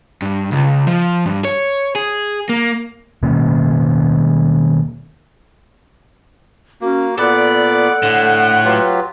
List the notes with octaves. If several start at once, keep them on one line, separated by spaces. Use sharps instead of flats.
G2
C#2
F3
G2
C#5
G#4
A#3
B2 D#3 A#3 C#4
A#3 C#4 F#4
A#2 B3 A4 D5 F#5 B5
A2 D3
F#3 F4 G4 B4